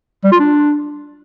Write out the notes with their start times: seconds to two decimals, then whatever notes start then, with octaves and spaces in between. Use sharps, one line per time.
0.25 G3
0.32 F4
0.40 D4